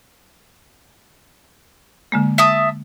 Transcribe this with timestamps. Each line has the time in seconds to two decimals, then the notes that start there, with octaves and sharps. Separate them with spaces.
2.12 D3 G#3 A#3
2.38 E5 A5 D#6